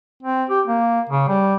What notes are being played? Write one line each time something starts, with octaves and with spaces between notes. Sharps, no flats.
C4
G4
A#3
C#3
G3